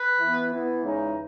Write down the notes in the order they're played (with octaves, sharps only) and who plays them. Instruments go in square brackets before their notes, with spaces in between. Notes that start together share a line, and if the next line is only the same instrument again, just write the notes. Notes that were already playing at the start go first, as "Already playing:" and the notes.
Already playing: [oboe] B4
[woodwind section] E3 B3 E4
E3 B3 E4
E2 C#3 E3 G#3 D#4